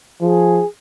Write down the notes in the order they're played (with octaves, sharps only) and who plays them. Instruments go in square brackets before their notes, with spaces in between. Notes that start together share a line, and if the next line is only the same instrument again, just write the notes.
[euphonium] F3 [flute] G#4